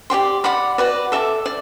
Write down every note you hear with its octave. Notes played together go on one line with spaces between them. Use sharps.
G4 D5 G5 C6
D5 F#5 B5 D6
F#4 B4 D5
A4 E5 A5 D6
D5